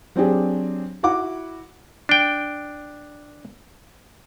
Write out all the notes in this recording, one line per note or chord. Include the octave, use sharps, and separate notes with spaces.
F#3 C4 D4 G4 G#4
E4 F#4 F#5 D6
D4 G5